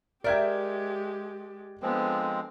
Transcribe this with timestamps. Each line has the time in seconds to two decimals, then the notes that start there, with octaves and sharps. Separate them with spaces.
0.24 G#3 G4 A#4 D5 E5 G5 G6 G#6
1.82 D3 F3 G#3 B3 C4